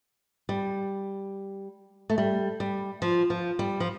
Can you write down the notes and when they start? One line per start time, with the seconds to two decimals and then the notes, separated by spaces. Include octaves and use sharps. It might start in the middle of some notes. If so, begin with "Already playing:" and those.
0.49 G3
2.10 A3
2.18 G3
2.60 G3
3.02 F3
3.30 F3
3.59 G3
3.80 F3